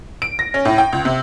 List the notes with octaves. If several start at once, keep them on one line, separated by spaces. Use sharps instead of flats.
D7
A#6
C#4
A2
G5
C#2
C3